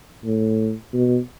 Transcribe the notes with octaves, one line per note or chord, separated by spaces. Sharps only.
A2
B2